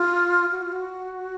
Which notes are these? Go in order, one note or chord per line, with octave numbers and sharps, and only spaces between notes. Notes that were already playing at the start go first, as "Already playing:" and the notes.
Already playing: F4
F#4
F4
F#4